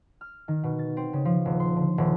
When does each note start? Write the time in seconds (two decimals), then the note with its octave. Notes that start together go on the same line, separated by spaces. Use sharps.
0.21 F6
0.48 D#3
0.63 B2
0.79 A6
0.97 C4
1.13 C#3
1.25 F3
1.45 D#1
1.60 C6
1.76 D3
1.98 D#1